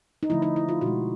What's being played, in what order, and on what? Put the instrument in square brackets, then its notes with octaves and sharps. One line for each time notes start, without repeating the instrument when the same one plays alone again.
[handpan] D#4
D3 F3 A3 E4
D#4
E4
F4
B2 G#3 F#4